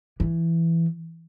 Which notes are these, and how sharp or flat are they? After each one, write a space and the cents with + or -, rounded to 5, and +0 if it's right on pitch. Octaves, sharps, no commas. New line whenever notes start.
E3 +10